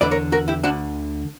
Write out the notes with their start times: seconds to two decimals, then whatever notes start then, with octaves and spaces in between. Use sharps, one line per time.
0.01 E2 D3 B4 D5
0.11 A#4 C#5
0.32 F#4 A#4
0.48 E4 G4
0.63 D2 D3 D4 F#4